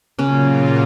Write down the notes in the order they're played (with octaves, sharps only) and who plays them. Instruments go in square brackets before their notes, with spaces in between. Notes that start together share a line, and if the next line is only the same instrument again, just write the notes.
[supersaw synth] A#2 F#3 A#3 F4 [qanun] C#3 C#4